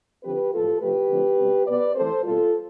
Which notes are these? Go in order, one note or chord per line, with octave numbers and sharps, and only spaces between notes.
D3 F3 C4 G4 B4
A2 F3 B3 F4 A4
C3 F3 A3 G4 B4
D3 F3 A3 C4
B2 G3 C4
B2 B3 B4 D5
E3 A3 C4 A4 C5
B2 G3 C4 F4 A4